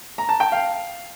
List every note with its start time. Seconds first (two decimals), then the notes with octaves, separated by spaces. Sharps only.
0.18 A#5
0.29 A5
0.40 G5
0.52 F5